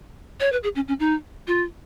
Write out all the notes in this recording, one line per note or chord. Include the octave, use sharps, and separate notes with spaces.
C#5
B4
G#4
C#4
C#4
D#4
F4